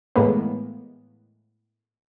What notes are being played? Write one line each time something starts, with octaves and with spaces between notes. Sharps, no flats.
A2 E3 G#3 A#3 B3